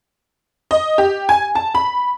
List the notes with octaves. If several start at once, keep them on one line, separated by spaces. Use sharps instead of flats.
D#5
G4
G#5
A5
B5